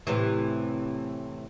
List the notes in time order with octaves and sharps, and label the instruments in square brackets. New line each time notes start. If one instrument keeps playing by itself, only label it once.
[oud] A2 C3 E3